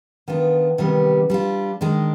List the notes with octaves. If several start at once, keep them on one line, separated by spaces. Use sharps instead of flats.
D#3 B3 D4 F4
C3 D#3 G3 B3
G3 D4 F4
D#3 G#3 D4